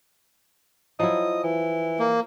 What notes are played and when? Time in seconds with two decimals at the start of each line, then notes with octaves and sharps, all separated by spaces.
1.00 F3 F#3 E4 D#5
1.44 E3
2.00 A#3